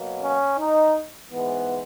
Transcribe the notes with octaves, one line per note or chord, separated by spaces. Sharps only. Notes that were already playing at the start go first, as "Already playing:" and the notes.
Already playing: B2 F#3 A#3
C#4
D#4
G#2 E3 G#3 B3